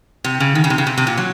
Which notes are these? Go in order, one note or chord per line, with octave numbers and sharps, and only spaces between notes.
C3
C#3
D#3
C#3
C3
C#3
C3
C3
A#2
F#3